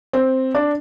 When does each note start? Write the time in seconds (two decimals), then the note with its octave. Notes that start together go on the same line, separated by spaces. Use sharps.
0.13 C4
0.55 D4